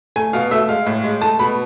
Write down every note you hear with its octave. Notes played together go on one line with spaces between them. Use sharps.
A3 G#5
B2 F5
A3 E5
G#3 F5
A2
G#3
A3 A5
B2 B5